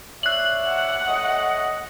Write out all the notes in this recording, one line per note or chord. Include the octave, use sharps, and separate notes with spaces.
C#5 D5 E5 F#6 F#7
F#5
A3 C#5 D#5